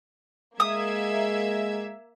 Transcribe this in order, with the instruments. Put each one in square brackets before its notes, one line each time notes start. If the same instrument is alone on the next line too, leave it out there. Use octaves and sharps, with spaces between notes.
[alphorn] G#3 [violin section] A#3 E5 G#6 [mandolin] D#6